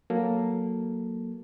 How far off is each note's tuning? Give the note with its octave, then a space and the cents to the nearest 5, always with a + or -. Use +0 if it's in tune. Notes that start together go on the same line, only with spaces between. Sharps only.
F#3 -5 A#3 +0 A4 +0